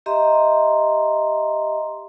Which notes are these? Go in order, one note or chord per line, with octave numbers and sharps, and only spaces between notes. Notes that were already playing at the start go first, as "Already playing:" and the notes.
G4 D#5 E5 A#5 C6